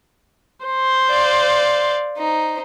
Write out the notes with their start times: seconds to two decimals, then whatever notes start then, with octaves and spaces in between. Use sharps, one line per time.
0.65 C5
1.09 D5 F5
2.18 D#4 C5